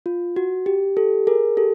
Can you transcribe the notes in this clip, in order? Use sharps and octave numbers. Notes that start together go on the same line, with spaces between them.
F4
F#4
G4
G4 A4
G#4 A#4
G4 A4